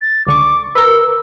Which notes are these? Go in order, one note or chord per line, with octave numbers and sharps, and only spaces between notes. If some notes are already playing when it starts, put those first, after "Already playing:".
A6
C#2 D3 C#6 D6
A#4 B4 E6